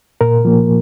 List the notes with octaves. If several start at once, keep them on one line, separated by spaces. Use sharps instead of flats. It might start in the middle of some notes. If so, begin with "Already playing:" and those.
A#2 A#4
F3 A#3